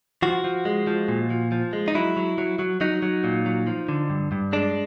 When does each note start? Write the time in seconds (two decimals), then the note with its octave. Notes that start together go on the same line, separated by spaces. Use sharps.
0.22 F3 F#4
0.44 F3
0.65 G#3
0.87 F3
1.08 A#2
1.30 F3
1.52 F3
1.73 G#3
1.88 D#4
1.95 F#3 E4
2.17 F#3
2.38 F#3
2.59 F#3
2.81 F#3 D#4
3.03 F#3
3.24 A#2
3.46 F#3
3.67 F3
3.89 D3
4.10 G2
4.32 G2
4.53 G#3 D4